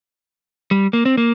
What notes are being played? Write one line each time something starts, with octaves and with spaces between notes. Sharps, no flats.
G3
A#3
C4
A#3